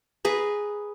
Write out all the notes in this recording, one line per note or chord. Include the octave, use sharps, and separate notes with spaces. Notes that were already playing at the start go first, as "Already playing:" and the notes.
G#4 B4 A#5